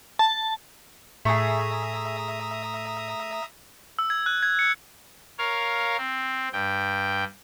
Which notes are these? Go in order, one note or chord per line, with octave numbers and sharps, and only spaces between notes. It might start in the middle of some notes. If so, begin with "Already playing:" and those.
A5
A2 A3 G#4 E5 A#5 D#6
E6
G#6
F#6
G#6
C#7
A#4 C#5 F5
C4
G2 G5